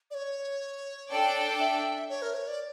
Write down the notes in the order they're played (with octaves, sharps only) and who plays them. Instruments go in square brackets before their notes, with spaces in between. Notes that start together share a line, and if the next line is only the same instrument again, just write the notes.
[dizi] D5
C#5
[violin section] D4 A4 D5 G5
[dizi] E5
C#5
A#4
C#5
D5